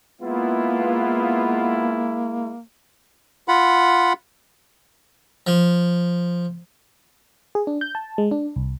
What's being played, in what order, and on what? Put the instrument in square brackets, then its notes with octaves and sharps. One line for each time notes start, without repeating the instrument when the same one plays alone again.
[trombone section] G#3 E4 [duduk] A#3 [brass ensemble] B3 F4
[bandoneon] F4 F#5 B5
[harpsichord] F3
[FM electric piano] G#4
D4
G6
A5
G#3
D4
C2